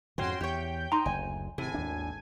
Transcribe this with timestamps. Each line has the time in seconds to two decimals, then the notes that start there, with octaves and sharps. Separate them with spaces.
0.18 F2 G#2 D3 C#4 F#4 G5 C6
0.41 E2 G4 C#5 G5 G6
0.92 D#4 A#5 C6
1.06 F#1 D2 G#5
1.58 G#1 A2 C3 G#5
1.74 D#2 D4